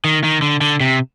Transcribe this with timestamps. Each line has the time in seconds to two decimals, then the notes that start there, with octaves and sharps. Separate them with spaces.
0.04 D#3
0.24 D#3
0.42 D3
0.61 D3
0.80 C3